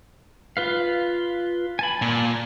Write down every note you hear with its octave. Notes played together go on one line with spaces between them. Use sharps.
F4 B4 F5
G#5 A5 B5
A#2